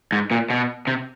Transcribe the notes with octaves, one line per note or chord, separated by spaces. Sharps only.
G#2
A#2
B2
C3